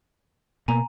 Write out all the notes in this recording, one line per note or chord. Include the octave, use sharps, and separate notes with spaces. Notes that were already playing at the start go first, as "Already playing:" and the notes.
B2 A#3 G#5 A#5